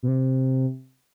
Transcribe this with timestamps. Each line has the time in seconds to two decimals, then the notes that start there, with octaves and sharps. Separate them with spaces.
0.03 B2
0.08 C3